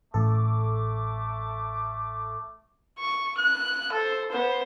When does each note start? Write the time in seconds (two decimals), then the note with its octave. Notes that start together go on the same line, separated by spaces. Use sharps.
0.14 A1 A3 A4 D6
2.98 C#6
3.37 F#6
3.93 A4 C5
4.31 B3 C5